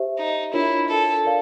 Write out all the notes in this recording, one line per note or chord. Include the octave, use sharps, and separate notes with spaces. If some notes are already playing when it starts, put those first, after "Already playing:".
Already playing: G4 C5 E5
D#4
D4 E4 F4 A#4 C#5
A4
A#4 D5 F5